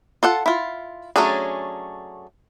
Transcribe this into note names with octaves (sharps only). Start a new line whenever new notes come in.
F4 A4 F#5
E4 F4
F#3 A3 C#4 D4 G#4